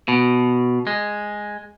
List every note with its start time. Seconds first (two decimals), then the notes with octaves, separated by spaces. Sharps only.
0.08 B2
0.87 G#3